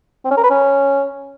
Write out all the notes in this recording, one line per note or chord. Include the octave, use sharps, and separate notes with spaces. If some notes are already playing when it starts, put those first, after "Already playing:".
C4
C#4
A#4
B4
C#4